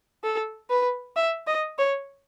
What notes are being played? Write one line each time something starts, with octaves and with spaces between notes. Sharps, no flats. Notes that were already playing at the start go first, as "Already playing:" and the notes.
A4
B4
E5
D#5
C#5